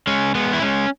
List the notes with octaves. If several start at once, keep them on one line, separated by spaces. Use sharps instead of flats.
G#3 C#4
G#3 B3
E4
G#3 C#4